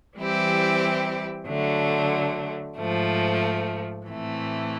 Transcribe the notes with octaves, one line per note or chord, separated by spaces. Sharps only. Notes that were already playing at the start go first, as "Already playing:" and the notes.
E3 G3 C4 E4 G4
D3 F#3 A3
G#2 F3 A3
A2 E3 A3 C4